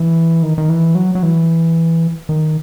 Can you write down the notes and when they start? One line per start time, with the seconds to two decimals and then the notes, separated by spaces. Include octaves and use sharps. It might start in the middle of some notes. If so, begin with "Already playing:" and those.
Already playing: E3
0.43 D#3
0.58 D#3
0.69 E3
0.95 F#3
1.15 F#3
1.23 E3
2.29 D#3